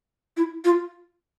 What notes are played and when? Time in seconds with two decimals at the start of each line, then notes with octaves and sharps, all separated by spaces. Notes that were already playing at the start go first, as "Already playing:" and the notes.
0.37 E4
0.65 F4